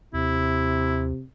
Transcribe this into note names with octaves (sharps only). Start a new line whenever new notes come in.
D#2 C3 E4